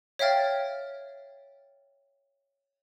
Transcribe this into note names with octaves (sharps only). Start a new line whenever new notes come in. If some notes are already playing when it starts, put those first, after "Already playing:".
C#5 E5 F5 G5 F6 A6